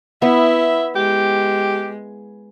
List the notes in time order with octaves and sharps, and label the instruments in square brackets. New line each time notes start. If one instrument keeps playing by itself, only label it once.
[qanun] B3 [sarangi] E4 [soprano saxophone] E5
[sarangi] G#3 [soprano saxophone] G4